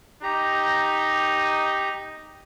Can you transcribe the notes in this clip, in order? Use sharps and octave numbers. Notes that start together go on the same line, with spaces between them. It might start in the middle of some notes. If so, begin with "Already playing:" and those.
D#4 G4 A#5